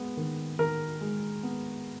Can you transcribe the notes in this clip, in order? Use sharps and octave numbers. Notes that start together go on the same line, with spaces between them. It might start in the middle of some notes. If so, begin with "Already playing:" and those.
Already playing: G#3 B3
D#3
D#3 A#4
G#3
B3